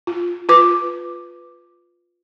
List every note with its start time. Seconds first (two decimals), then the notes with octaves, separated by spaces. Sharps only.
0.07 F4
0.49 F4 B4 D6